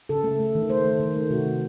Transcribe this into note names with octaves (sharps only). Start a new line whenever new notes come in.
C#3 A4
A3
A3
D#3
A3 C5
D#3
D#3
A3
C3 F#4
A3